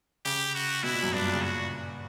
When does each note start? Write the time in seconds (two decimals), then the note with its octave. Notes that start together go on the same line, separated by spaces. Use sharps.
0.25 C#3 G4
0.55 F#4
0.83 B2 E4
0.94 A#2
1.03 F#2
1.13 G2 D4
1.23 A#2
1.33 C#3
1.42 A#2 F#4